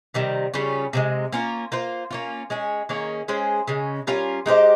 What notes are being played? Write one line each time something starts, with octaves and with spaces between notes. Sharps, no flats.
C3 D#3 G3
C#3 G3 C#4 F4
C3 F3 G#3
A#3 C#4 F4 A#4
A#3 F4 C5
A#3 C#4 F4
G#3 C#4 G#4
D#3 A#3 C#4 G#4
G#3 C#4 G#4 C5
C#3 G#3 C#4
G3 C#4 F4 A#4
G#3 D#4 G4 C5